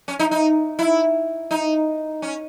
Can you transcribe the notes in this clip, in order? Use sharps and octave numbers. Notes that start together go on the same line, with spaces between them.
C#4
D#4
D#4
E4
D#4
C#4